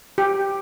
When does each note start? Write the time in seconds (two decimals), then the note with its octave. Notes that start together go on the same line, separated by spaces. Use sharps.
0.18 G4